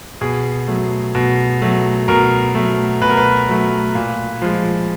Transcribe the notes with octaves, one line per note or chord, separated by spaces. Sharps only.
B2 G#4
F#3 A3
B2
F#3 A3
B2 A#4
F#3 A3
B2 B4
A#4
B4
F#3 A3
A#2
F3 G#3